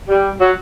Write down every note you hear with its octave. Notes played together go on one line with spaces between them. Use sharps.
G3
F#3